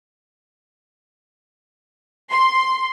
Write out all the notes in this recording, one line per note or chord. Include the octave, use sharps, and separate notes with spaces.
C6